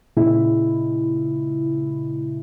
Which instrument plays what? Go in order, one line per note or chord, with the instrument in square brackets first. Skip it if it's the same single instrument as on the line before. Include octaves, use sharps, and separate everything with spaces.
[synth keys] A#2 C#3 G#3 E4